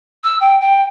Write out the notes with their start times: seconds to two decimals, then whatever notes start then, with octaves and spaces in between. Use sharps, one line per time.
0.24 E6
0.40 G5
0.61 G5